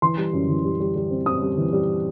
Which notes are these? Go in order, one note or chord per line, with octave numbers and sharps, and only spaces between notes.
E3 C6
G3
F#2
E3
G3
G3
G3
C4
C4 D#6
G3
E3
G3